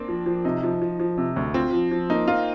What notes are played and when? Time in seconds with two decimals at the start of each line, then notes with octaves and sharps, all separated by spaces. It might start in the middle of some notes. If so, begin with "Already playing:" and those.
Already playing: A#3 C4 D4
0.08 F3
0.26 F3
0.45 C3 D#4
0.63 F3
0.82 F3
0.99 F3
1.18 C3
1.36 D2
1.54 C4 F4
1.73 F3
1.91 F3
2.10 A#3 D#4
2.28 A#3 F4